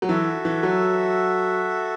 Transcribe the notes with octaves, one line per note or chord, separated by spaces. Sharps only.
F#3
E3 F#4 A4 E5
E3
F#3